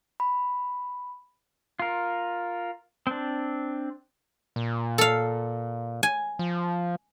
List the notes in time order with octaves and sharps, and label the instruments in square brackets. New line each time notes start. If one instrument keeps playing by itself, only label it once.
[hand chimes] B5
[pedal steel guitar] F4 A#4
C4 D4
[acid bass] A#2
[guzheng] A4 F5
G#5
[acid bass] F3